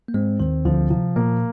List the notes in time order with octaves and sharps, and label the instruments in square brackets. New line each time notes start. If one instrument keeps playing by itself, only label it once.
[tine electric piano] A#3
[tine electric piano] G#2 G#3 [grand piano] C4
[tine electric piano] D#2 D#3 [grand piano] C4
[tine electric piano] D2 D3 [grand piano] F3
[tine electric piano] C3 [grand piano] F3
[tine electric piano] A#2 [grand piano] A#3